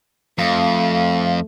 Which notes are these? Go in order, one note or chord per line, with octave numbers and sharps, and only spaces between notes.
F2 A3 F5